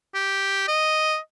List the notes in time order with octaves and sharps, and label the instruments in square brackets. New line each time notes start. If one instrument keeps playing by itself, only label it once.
[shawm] G4
D#5